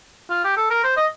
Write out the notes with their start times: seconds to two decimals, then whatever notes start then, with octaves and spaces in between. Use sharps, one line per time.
0.30 F4
0.44 G4
0.57 A4
0.70 A#4
0.84 C5
0.97 D#5